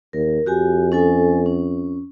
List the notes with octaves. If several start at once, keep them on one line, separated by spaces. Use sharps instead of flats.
D#2 A#4
F2 F#4 G4 G#5
C#4 A4 G#5
C#4